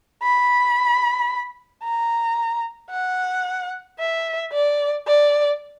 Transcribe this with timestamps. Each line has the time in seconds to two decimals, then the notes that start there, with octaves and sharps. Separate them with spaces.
0.23 B5
1.83 A#5
2.91 F#5
3.99 E5
4.52 D5
5.06 D5